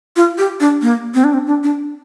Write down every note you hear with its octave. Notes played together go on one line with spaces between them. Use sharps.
F4
G4
D4
A#3
C4
D4
C4
D4
D4